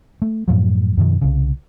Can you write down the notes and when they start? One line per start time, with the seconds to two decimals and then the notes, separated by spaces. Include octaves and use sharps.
0.22 A3
0.48 F#2 A2 F3 F#3
0.97 F#2 B2 D#3 F3
1.21 C2 C#3